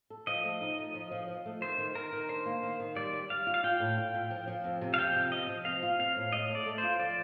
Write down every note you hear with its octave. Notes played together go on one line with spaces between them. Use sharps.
A4
F3 D#5
A3
D#4
F3
F3
F3
F3
A3
D#3 C5
D#3
D#3 A#4
D#3
D4 C5
A#3
D#3
D#3
G3 D5
G3
G3 F5
F4
F5
F4 G5
A2
F4
A2
F3
F3
F2
C3
F5
F2 G5
C3
F3 D#5
F3
C4 F5
F4
C4 F5
A2
A2 D#5
A3
D5
A3
C5
F4
F3 D5